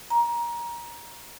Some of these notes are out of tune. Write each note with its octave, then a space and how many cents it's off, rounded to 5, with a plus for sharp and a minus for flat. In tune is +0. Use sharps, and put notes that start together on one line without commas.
A#5 +20